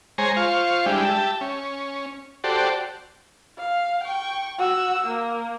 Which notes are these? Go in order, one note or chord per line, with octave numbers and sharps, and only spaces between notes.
G#3 C5 C#5 G#5 A#5
F4 C5 F5 C#6
G3 G#3 D4 E4 G4
G4 E5 A5
C#4
F#4 G4 A4 C5 D5
F5
G5 C#6
F#4 E6
A#3